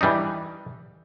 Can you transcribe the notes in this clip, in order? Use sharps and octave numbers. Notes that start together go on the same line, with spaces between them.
E3 G3 D4 D#4